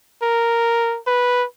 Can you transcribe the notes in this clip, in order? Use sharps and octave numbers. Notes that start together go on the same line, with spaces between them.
A#4
B4